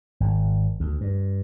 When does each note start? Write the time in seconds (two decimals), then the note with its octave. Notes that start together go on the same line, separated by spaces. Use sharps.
0.20 G#1
0.80 D2
1.01 G2